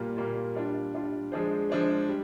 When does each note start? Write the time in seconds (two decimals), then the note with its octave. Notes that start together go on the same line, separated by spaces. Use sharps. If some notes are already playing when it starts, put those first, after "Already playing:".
Already playing: A#2 G3 A#3 F4
0.16 A#2 G3 A#3 F4
0.55 G3 D4 F4
0.94 G3 D4 F4
1.32 F3 G#3 D4 G#4 C5
1.70 F3 G#3 D4 G#4 C5
2.09 G3